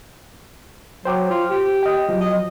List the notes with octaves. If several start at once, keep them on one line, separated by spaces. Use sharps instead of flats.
F#3 C5 G5 D6
F4
G4
D#5 G5
F3 F#3
D#5